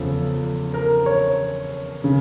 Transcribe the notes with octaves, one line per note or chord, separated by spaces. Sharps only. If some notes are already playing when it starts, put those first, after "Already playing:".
Already playing: E2 C#3 F3 A4
A#4
C#5
C#3